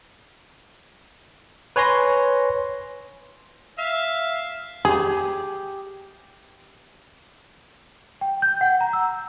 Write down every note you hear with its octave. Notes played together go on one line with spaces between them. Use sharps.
B4 C#5 G#5 C6 A#6
E5 F5
G4 G#4
G5
G6
F#5
A#5
E6